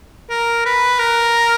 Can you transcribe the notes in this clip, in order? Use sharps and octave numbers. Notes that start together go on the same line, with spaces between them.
A#4
B4
A#4